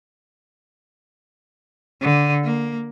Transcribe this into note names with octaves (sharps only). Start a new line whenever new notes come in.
D3
A#3